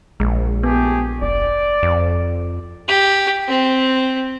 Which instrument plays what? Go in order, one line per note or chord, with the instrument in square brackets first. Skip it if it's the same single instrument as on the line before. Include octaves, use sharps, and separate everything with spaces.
[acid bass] A#1 [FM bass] G#3
[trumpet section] A3 G4 G#4 [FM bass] B3
[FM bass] F1 [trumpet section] D5
[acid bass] F2
[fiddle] G4
C4